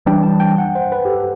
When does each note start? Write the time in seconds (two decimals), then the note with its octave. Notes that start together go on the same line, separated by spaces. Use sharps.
0.06 E3 G3 D4 G5
0.23 A5
0.40 G5
0.58 F#5
0.75 C5
0.92 B4
1.05 G4
1.08 A4